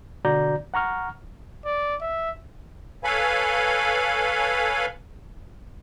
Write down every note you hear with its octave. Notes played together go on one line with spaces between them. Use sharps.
B2 D3 F#4 D5 A#5 G6
F#5 A#5 C#6 F6
D5
E5
A4 B4 C#5 F5 G#5 B5